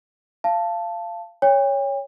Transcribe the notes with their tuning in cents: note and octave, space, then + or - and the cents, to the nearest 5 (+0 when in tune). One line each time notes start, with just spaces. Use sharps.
F5 -20 A5 +0
C#5 +5 G5 +40